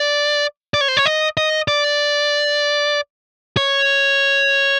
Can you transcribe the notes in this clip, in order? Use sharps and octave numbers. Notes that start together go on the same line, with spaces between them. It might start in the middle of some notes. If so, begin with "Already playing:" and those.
Already playing: D5
D5
C#5
C5
C#5
D#5
D#5
D5
C#5